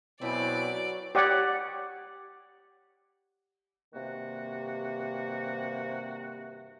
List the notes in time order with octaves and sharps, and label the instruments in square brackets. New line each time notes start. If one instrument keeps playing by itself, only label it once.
[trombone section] B2 C4 B4 [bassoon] F#3 [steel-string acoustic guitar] E4 G#5 [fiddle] D5 D6
[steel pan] G4 C#5 D5 F#5
[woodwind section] G2 C3 D#3 A#3 F#4